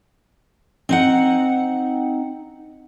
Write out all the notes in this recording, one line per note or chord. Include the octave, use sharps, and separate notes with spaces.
C4 D#4 F#5